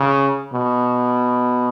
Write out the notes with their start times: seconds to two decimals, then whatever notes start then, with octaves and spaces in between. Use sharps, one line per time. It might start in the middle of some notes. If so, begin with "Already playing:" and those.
Already playing: C#3
0.53 B2